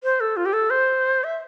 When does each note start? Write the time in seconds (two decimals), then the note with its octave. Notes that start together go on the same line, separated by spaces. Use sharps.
0.04 C5
0.20 A4
0.37 F4
0.46 G4
0.53 A4
0.70 C5
1.24 E5